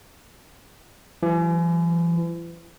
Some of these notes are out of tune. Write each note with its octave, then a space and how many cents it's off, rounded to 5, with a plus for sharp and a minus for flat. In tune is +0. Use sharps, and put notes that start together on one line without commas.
E3 +40 G3 -35